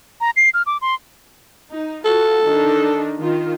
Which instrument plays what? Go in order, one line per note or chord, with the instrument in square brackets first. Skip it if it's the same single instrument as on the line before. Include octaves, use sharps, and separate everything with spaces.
[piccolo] A#5
C7
F6
D6
C6
[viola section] D#4
[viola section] F4 F#4 [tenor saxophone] A4
[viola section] D#3 D4 D#4
D#3 F4